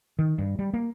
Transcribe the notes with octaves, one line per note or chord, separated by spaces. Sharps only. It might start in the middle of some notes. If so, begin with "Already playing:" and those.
D#3
G2
G3
A#3